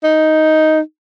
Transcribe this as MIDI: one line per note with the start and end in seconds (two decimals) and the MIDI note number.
0.04 0.80 63